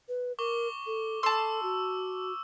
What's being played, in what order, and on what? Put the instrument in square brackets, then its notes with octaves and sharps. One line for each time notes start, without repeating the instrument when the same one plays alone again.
[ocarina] B4
[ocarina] A#4 [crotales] C#6 D6 G7
[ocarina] A4
[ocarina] A4 [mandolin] A5 C6 [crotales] E6
[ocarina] F#4